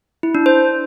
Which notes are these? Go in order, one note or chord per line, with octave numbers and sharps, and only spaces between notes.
E4
D4
C5